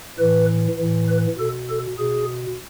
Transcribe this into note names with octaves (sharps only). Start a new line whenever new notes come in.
A2 E3 B4
A2 E3
B4
B2 A4
A4
B2 G#4